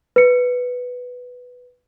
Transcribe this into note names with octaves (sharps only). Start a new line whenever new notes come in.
B4 C#7